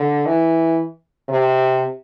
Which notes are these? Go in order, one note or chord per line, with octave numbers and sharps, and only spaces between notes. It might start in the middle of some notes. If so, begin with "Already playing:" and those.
Already playing: D3
E3
C3